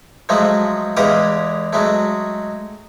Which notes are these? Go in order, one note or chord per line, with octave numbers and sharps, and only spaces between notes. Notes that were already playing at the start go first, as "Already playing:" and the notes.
F3 F#3 G#3 A3
E2 E3 G#3 G4 F5 D#6
F#3 G#3 A3